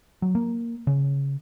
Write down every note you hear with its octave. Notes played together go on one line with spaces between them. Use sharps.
F#3
A#3
C#3